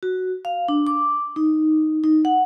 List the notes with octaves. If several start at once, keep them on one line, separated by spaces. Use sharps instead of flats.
F#4
F5
D4
D6
D#4
D#4
F#5